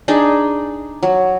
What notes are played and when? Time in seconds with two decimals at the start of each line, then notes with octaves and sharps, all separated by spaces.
0.08 D4 D#4 G#4
1.03 F#3